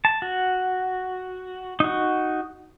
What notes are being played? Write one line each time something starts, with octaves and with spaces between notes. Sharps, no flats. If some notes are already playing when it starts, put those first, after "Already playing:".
A5
F#4
D#4 F#4